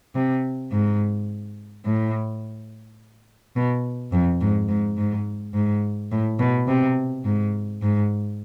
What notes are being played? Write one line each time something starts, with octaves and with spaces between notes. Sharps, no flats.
C3
G#2
A2
B2
F2
G#2
G#2
G#2
G#2
A2
B2
C3
G#2
G#2